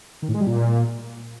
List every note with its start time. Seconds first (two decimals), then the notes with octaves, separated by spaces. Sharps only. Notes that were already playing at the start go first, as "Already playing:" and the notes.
0.22 D#3
0.28 A2
0.34 G#3
0.40 G3
0.46 A#2